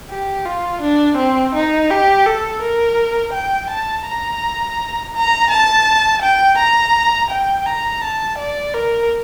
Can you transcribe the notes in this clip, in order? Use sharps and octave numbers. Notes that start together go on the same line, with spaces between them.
G4
F4
D4
C4
D#4
G4
A4
A#4
G5
A5
A#5
A#5
A5
G5
A#5
G5
A#5
A5
D5
A#4